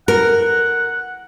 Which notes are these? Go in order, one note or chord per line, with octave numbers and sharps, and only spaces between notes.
A#4 F#5